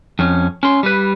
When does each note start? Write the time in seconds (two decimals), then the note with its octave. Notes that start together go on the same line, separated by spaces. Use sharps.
0.19 F2 C#4
0.63 C#4 C6
0.83 G3 B4